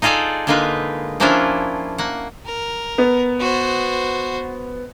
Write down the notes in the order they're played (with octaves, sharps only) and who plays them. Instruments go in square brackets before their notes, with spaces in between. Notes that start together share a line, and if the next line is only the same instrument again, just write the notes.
[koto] D#4 F4 G#4 A4 D5 F5
D3 G#3 A#3 D#4 F4 B4
F3 A#3 C#4 D4 E4 F4
A#3 F#5
[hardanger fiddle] A#4
[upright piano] B3
[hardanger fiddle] F#4 C5